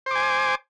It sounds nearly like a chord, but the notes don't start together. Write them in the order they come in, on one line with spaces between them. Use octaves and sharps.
C5 D6 G#5